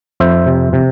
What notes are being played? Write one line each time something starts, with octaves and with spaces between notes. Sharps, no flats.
F2 C5 E5
C3
C3